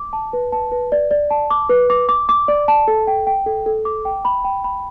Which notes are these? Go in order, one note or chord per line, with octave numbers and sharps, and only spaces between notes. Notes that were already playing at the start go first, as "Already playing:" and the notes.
Already playing: D6
A5
B4
A5
B4
D5
D5
A5
D6
B4
D6
D6
D6
D5
A5
A4
G5
G5
A4
A4
D6
G5
B5
G5
B5